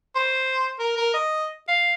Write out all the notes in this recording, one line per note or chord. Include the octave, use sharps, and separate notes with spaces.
C5
A#4
A#4
D#5
F5